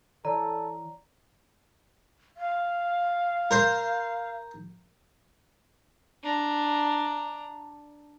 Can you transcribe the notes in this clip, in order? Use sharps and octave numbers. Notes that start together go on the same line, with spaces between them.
E3 A4 C#5 D5 A#5
F5
A#4 C5
D4 A#5